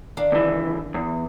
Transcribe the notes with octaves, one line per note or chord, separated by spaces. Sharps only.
D#3 D4 F5
C#2 E3
E2